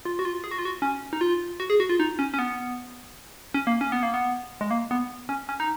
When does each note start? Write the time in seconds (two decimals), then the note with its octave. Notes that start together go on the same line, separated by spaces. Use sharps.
0.05 F4
0.19 F#4
0.25 F4
0.44 G#4
0.51 F#4
0.58 F4
0.65 F#4
0.82 C#4
1.13 D#4
1.21 F4
1.60 F#4
1.70 G#4
1.80 F#4
1.89 F4
2.00 D#4
2.19 C#4
2.34 C#4
2.39 B3
3.54 C#4
3.67 A#3
3.81 C#4
3.92 B3
4.03 A#3
4.14 B3
4.61 G#3
4.71 A#3
4.91 B3
5.29 C#4
5.49 C#4
5.60 D#4